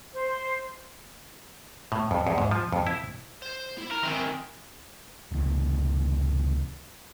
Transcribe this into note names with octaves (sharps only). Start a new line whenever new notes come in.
C5
A2
F2
E2
G#2
F3
F2
E4
C5
E4
A#4
D#3 E3 C4 C6
F1 C#2 E3